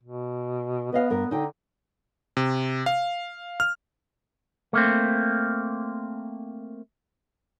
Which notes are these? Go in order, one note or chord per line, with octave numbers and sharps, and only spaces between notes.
B2
B3 B4 D#5 F5
G2 A#4
D3 D#4 G5
C3
F5
F6
A3 A#3 C4